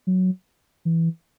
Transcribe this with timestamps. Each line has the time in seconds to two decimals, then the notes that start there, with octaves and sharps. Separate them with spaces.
0.07 F#3
0.85 E3